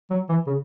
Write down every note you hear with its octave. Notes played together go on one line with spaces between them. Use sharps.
F#3
E3
C#3